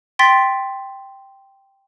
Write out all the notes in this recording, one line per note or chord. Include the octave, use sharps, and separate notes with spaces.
G5 C6 A6 B6